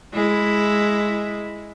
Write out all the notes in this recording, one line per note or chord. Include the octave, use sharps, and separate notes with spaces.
G#3 E4